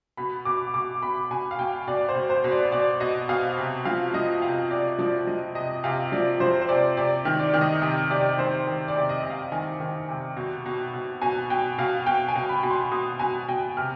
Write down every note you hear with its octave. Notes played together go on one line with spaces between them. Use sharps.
B2 B5
B2 D6
B2 D6
B2 B5
B2 G#5
F5
B2 G5
B2 D5
C5
B2
C5
B2
D5
B2 D5
B2 D#5
B2 F5
C3
F3 F5
F3 D#5
C3 F5
C3 D5
F3 D5
F3 D#5
C3 D#5
C3 F5
F3 D5
F3 C5
C5
C3 D5
C3 D5
D#3
D5
D#3
D#5
C3 D#5
C3 D5
D#3 C5
D#3
D5
C3
D#5
C3
F5
D#3 G#5
D#3
C3
B2
B2
B2
B2 G#5
B2 G5
B2 F5
B2 G5
G#5
B2
B5
B2
C6
B2 D#6
B2 G#5
B2 G5
C3 F6